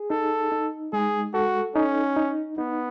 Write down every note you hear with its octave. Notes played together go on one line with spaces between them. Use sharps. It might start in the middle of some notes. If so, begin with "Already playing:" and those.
Already playing: G#4
D#4 A4
D#4
G#3 G#4
F#4 A4
C#4 D#4
D#4
B3 D#4